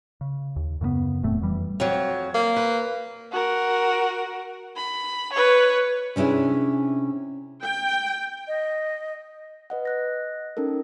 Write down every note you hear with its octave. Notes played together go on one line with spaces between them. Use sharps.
C#3
D#2
F#2 C#3 G#3 B3
E1 A2 A3 C4
F2 E3 G3
F2 F3 F#3
A#3
B4
F#4 A#4
B5
B4 C#5
C3 C#4 D4 E4 G#4
G5
D#5
B4 D#5 F#5
D#5 F#6 A#6
C#4 D#4 A4 A#4